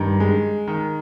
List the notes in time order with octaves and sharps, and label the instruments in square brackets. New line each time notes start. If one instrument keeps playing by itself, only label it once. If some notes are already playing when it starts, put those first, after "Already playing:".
Already playing: [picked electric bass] G2 [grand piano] D#3
[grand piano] G#3
D#3